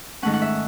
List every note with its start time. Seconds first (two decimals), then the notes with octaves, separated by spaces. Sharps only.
0.22 G#2 D#3 A3 C#4 F#5
0.33 F#5
0.42 E5